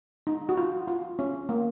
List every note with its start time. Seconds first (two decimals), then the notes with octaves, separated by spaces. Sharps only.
0.27 D#4
0.49 F#4
0.57 F4
0.88 F4
1.19 C#4
1.49 A#3